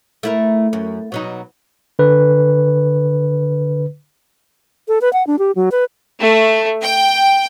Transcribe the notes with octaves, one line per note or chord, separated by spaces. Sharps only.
A3 E4 A#4
F#2
B2 F#3 D#4
D3 B4
A4
B4
F#5
D4
G4
F#3
B4
A3
G5